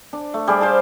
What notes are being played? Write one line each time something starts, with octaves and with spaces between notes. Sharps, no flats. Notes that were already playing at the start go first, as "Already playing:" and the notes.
D4
A3
G3 G#4 D5
C5 F5 A5